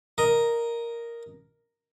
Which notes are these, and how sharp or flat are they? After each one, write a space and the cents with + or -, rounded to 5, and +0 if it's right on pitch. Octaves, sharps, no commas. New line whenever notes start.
A#4 +0 D#5 +0